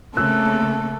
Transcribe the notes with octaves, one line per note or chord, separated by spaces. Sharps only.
C#3 A3 A#3 C4 A4 E6 F#6